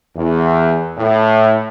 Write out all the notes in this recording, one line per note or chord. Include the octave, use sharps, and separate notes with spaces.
E2
A2